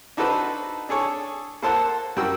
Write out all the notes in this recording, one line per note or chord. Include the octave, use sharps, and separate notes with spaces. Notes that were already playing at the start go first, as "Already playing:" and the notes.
D4 D#4 F#4 A4 B4 C5
D4 G#4 A4 C#5
A#3 A4 C5 F#5 A5
F#2 G3 F#4 A#4 G5 E6